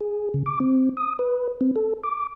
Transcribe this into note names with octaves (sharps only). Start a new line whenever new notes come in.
G#4
C#3
D6
C4
D#6
B4
C4
A4
D6